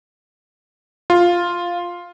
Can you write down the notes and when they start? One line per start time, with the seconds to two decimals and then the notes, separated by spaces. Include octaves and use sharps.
1.10 F4